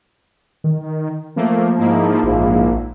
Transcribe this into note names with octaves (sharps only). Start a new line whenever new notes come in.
D#3
F3 A3 A#3
G#2 A#3 D#4 E4
A#1 G#2 F3